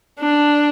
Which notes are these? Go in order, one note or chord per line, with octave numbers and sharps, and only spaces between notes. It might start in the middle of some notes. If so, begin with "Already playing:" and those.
D4